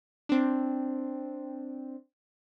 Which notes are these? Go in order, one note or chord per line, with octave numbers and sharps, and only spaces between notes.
C4 D4